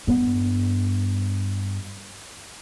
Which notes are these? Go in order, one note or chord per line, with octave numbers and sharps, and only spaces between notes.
G2 B3